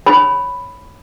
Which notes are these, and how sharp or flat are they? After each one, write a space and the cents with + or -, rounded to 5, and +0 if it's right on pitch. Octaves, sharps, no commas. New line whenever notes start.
C#5 +0 G#5 +0 B5 +5